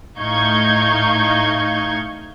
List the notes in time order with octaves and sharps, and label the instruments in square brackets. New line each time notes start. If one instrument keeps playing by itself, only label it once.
[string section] A2 D#4 F5 C#6 G6 G#6